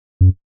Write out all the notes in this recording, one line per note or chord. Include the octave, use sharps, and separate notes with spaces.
F#2